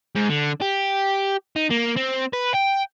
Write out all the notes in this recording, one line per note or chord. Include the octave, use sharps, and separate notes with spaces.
G#2
D3
G4
D#4
A#3
C4
B4
G5